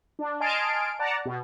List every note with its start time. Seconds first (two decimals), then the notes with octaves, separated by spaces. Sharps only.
0.19 D4
0.40 D#5 G#5 A5 C6 F6 D7
0.99 D5 F#5 A5 A#5
1.25 B2